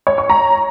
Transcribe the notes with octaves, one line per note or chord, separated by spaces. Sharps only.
C#5
C#6
A#5